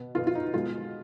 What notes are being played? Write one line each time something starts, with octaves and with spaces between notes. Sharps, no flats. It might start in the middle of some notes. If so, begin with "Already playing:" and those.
Already playing: B2 B3
B2 B3 F4
F4
D#4
B2 G#3 B3 F4